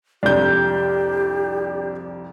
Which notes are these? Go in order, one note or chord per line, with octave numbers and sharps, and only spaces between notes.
C2 F2 D4 G4 G6